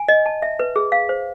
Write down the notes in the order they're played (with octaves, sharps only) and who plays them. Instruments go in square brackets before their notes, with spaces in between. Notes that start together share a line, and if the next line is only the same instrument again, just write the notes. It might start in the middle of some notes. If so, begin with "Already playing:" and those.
Already playing: [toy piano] G#5
D#5
A5
E5
B4
G#4
F5
C5